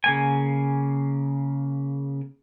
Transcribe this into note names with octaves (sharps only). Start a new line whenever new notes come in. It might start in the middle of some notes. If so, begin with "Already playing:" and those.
C#3 A#3 G#5